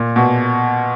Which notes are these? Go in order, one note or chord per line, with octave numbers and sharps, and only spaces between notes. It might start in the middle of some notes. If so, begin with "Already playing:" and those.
Already playing: A#2
B2